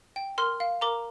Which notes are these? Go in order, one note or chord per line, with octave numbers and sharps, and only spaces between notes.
G5
A#4 C6 F6
F5
A#4 A#5 D6